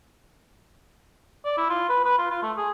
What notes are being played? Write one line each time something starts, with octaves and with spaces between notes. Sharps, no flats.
D5
E4
F4
B4
B4
F4
F4
A3
G#4